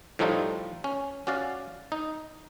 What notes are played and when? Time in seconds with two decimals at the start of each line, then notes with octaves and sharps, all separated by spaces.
0.19 A2 F3 G3 A3 D#4 F4
0.84 C#4
1.27 C#4 F#4 D5 F5
1.92 D#4